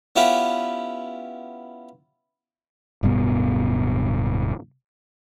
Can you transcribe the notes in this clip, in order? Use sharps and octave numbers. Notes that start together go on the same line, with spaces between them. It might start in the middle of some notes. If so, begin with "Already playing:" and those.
B3 C#4 E4 F4 G4 B4
D1 G2 B2 B3